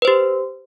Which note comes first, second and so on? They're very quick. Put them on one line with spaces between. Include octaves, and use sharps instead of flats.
B4 C5 G4